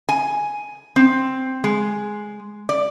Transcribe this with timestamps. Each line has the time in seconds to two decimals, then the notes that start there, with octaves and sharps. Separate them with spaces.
0.09 G#5
0.96 C4
1.64 G#3
2.69 D5